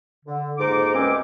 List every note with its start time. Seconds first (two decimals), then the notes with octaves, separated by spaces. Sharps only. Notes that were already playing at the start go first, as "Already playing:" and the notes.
0.25 D3
0.58 F2 G#2 A#3 D#4 D6
0.94 C2 B2 G#3 C4 C#4 D6